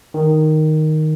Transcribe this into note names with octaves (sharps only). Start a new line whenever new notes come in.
D#3